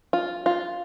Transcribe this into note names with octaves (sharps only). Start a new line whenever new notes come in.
F4
F4